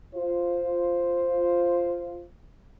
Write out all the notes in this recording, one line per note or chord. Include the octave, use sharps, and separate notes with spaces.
F4 C5